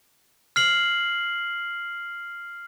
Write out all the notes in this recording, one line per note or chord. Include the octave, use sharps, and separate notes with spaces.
F6 C7 F#7